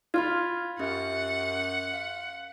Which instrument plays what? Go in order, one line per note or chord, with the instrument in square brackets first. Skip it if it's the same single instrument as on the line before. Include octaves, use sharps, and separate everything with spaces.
[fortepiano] F4 [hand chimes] B5 F6 G#6
[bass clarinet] F#2 [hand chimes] C#4 G4 [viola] F#5
[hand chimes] F5